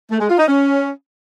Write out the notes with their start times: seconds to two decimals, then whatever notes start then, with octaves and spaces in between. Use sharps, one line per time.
0.10 A3
0.20 G#3
0.29 F4
0.38 D#4
0.47 C#4